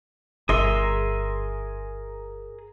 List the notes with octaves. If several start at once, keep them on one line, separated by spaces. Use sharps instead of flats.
G1 G#4 A#4 E5 C6